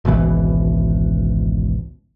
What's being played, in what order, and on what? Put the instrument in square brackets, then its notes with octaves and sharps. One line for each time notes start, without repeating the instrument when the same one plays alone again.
[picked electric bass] G#1 C#2 B2 E3